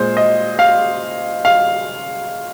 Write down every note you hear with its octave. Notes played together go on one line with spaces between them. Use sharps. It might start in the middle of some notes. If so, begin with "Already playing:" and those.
Already playing: A#2 G#3 C5
D#5
F5
F5